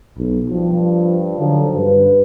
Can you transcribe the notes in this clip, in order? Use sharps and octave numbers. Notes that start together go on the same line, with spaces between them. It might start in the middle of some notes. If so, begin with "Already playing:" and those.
B1
G2 F3
D3 D#3 F3 F#3
G2 B4